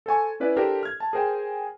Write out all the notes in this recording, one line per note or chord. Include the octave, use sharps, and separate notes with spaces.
A4 C5 G#5 C#6
C#4 E4 B4 D5
D4 G4 A4 A#4 C5
F6 G#6
A5
G#4 A#4 C5 G5 G#5